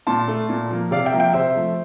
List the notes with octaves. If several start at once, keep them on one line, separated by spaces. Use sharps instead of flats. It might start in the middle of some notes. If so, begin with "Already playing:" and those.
A#2 A5 C6
A3
A#2
F3 A#3
C3 D5 F5
E5 G5
F3 A#3
E5 G5
C3 C5 E5
F3 A3